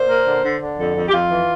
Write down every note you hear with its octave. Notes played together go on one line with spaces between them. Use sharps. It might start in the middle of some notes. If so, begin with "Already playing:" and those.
Already playing: A#2 C5
A#3
D3
D3
D3
F2 A4
F2
G4
F2 F4
E3